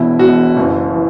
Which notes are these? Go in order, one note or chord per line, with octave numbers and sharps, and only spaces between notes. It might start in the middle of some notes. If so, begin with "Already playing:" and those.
Already playing: E1 E2 B2 E4
E1 E2 B2 F#4
F#1 F#2 E3
E3